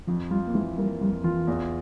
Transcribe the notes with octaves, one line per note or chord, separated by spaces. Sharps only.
F2 F3
G3 F4
A#3
E3 G#3
G3 A#3
F2 G3
E3 F4
E2